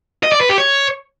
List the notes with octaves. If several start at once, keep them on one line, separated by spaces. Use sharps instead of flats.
D#5
D5
B4
G4
C#5